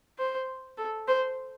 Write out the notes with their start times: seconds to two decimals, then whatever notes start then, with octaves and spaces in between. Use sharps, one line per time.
0.19 C5
0.78 A4
1.08 C5